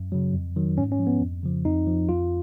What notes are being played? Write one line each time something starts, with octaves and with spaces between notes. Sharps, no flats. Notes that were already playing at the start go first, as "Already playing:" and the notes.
Already playing: F#2
C#3 F#3
F2
D#3 F#3
G#2 C#4
C#4
F3
B3
F2
C#3 F3
F2 D#4
F3
F2 F4